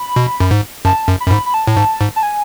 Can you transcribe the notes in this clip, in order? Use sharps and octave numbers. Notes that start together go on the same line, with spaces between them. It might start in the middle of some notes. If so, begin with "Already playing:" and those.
Already playing: B5
B2
F#2
G#2
F#2 A5
F#2
B5
F#2
G#2
B5
A5
A2
G#2
G#2
A5
G#5